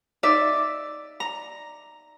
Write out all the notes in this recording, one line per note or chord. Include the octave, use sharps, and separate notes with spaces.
D#4 D5 E5
A#5